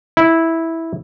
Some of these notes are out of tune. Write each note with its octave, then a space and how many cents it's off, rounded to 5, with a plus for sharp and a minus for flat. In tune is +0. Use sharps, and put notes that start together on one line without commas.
E4 -10